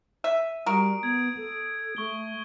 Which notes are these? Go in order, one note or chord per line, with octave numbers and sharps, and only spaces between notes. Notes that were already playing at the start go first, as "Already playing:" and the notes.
E5 D#7
G3 F#4 A#4 D#6 D7
B3 G#6
A4
A3 C#6 G7